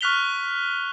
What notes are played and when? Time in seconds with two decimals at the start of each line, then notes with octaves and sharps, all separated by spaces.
0.01 C#6 F6 F#6 B6 F7 G7